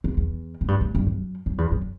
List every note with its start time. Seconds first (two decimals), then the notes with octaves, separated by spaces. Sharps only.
0.04 E2
0.17 E2
0.61 A2
0.68 G2
0.81 A2
0.95 G2
1.07 F#2
1.46 F#2
1.58 E2
1.71 F#2